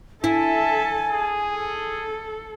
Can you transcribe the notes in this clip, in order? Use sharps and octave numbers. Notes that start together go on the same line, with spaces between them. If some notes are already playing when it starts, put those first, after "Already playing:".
E4 A4 E5 G#5 A5
G#4
A4